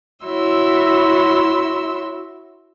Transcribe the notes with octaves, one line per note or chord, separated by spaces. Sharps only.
E4 F#4 C#5 E5 C6 E6